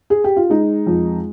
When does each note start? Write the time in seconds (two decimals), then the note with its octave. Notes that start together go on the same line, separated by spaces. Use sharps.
0.10 G#4
0.24 G4
0.36 F4
0.50 G#3 D#4
0.87 F2